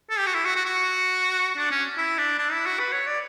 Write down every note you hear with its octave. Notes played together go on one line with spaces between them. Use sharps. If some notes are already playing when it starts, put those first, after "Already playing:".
A4
G4
F#4
E4
F#4
F#4
F#4
D4
C#4
E4
D4
D4
E4
F#4
B4
C#5
D5